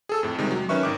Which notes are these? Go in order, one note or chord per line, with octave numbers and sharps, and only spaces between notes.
G#4 A4 E6
F2 A2
C3 D#3 G3 G#3
F#3
D#3 C#4 B4 E5 C#6
G#1 D#3 D6